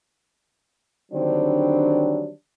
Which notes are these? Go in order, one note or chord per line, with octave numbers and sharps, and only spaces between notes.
D3 D#3 F#3 G3 C4 D4